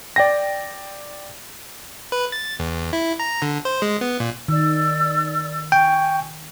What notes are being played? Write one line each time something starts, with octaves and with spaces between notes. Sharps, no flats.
D5 G5 A#6
B4
A6
E2
E4
A#5
D3
C5
G#3
B3
A#2
D#3 D5 E6
G5 G#5 C#6